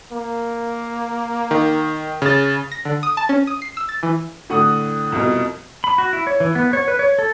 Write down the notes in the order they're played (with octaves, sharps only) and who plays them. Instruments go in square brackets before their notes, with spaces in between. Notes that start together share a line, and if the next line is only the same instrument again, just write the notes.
[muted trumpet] A#3
[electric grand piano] D#3
C#3 A6
[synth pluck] A#6
D3
D#6
A5
C#4
D#6
C7
E6
A6
E3
[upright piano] A2 D3 F#5 C#6 D#6
C2 F2 B2
[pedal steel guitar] B5
F#4
E4
C#5
E3
B3
C#5
B4
C#5
A4